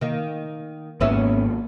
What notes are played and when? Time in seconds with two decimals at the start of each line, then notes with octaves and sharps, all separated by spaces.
0.01 D#3 A#3
1.00 G#1 G#2 A#3 B3 C#4 E5